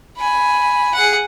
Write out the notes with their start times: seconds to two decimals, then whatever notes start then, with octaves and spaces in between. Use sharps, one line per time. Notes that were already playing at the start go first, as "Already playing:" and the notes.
0.18 G#5 B5
0.95 G#4 F#5